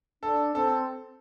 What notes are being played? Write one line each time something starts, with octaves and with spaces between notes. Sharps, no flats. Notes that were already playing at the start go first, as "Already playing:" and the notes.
D4 A4
C4 A4